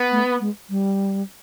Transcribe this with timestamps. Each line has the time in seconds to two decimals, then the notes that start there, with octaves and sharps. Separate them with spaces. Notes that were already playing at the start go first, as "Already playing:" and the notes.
Already playing: B3
0.12 A3
0.40 G#3
0.70 G3